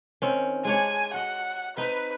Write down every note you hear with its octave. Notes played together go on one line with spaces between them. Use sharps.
D#3 C4 C#4
G#3 D4 C#5 G#5
F#4 D#5 F#5
C4 D#4 B4